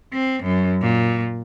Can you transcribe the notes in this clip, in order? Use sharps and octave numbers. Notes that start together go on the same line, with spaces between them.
C4
F#2
A#2